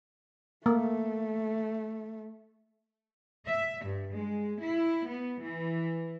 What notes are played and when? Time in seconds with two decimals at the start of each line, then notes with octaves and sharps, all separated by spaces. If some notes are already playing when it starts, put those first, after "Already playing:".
0.66 A3 A#3
3.46 E5
3.85 G2
4.14 G#3
4.61 E4
5.07 B3
5.40 E3